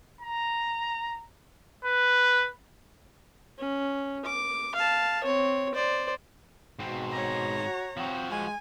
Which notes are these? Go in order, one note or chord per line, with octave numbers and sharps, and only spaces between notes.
A#5
B4
C#4
D6
F5 A5
C4 C#5
C5 D5
G#2 B2 C4
C#5 A#5
F#4
F3 C4 F#4
G#3 G#5